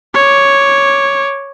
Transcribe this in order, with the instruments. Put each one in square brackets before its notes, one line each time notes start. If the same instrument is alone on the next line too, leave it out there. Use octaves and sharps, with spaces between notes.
[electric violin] C#5 D6